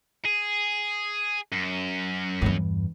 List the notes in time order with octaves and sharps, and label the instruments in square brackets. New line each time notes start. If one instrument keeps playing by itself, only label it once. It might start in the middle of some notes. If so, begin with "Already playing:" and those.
[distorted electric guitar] G#4
F#2
[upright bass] E2 G2